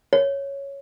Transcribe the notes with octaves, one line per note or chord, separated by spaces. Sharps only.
C#5